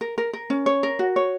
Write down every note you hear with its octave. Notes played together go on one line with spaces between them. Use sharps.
A#4
A#4
A#4
C#4
C#5
A#4
F#4
C#5